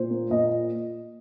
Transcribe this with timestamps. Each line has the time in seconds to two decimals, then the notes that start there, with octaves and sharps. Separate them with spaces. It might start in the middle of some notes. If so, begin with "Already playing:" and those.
Already playing: A#2 C5
0.10 A#3
0.30 A#2 D#5